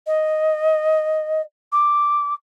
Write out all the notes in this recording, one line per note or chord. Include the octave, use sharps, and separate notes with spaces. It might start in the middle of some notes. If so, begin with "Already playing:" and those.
D#5
D6